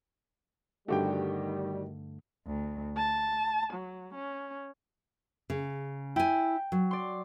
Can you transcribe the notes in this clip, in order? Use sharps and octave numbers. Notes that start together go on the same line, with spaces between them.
G2 D3 D#3 G3 A3 F#4 G4 G5
D2
A5
F#3
C#4
C#3
E4 G5 G#5
F#3
D5 C6